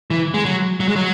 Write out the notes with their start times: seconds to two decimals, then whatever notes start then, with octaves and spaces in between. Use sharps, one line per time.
0.10 E3
0.34 G#3
0.45 F#3
0.80 F#3
0.88 G#3
0.96 F#3